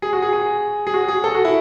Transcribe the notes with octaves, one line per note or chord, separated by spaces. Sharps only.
G#4
F#4
G#4
G#4
G#4
F#4
G#4
A4
F#4
E4